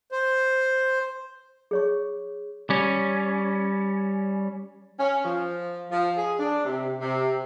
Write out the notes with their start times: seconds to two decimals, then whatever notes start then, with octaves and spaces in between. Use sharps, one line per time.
0.12 C5
1.71 G#4 C#5 C#6
2.70 G3 C#4
4.99 C#4
5.24 F3
5.91 F3
6.17 G#4
6.39 D4
6.65 C3
7.01 C3